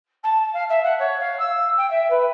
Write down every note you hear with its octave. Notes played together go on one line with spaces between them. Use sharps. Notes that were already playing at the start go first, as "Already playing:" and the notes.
A5
F5
E5
F#5
C#5
F5
E6
G5
E5
B4